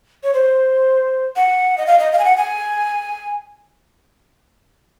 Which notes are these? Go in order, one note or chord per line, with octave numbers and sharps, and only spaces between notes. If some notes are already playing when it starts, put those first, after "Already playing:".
C#5
C5
F#5
D#5
F5
D#5
F5
G#5
F#5
G#5